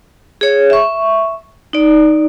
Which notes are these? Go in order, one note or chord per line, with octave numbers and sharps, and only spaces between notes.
G#4 C#5
E5 C#6
D#4 D5